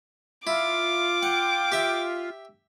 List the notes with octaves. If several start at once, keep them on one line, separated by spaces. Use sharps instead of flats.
E4 F4 D6
F#5 G5
G4 E5